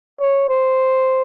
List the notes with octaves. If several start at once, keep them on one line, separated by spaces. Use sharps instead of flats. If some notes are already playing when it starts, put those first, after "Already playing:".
C#5
C5